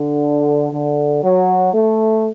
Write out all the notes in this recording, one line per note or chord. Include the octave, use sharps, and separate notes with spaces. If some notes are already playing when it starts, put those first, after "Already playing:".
Already playing: D3
D3
F#3
A3